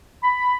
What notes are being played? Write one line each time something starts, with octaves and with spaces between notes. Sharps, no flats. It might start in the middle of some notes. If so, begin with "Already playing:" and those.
B5